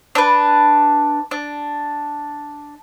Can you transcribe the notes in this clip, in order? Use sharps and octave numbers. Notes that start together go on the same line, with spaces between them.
D4 B4
D4